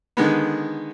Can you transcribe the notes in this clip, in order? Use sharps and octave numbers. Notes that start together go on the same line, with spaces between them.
D3 D#3 G#3 B3